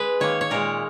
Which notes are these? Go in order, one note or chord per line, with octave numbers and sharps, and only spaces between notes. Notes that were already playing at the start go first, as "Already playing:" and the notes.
Already playing: G#3 B4
D#3 A#3 C#5
C#5
A#2 G#3 A#4